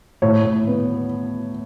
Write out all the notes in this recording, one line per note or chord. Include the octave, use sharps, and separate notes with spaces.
A2 C#5
A2
B3